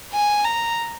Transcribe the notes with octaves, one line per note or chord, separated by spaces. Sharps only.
G#5
A#5